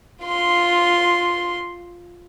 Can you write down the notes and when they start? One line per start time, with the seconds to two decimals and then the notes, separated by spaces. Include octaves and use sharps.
0.24 F4 C6